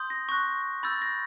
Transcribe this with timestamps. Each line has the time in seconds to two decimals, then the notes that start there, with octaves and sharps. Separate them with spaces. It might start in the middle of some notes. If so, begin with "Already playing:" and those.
Already playing: C6 D#6 G6
0.10 A#6
0.29 C#6 F#6 A#6
0.83 B5 E6 G6 A6
1.02 A#6